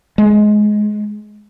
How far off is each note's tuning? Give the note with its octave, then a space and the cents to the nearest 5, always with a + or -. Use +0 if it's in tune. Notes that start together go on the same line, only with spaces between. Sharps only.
G#3 +15